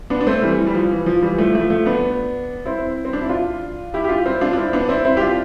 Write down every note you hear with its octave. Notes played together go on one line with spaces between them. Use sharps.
B3 D4
D4
A3 C4
E3 G3
E3
G3
F3
E3
F3
E3 G3
F3 A3
F3 A3
F3 A3
B3 D4
C4 E4
C4
D4
E4
D4 F4
E4 G4
G4
D4 F4
C4 E4
D4 F4
D4
C4 E4
B3 D4
C4 E4
C4 E4
G4
D4 F4